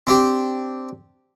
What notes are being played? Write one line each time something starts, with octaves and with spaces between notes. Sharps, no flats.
C4 D4 G4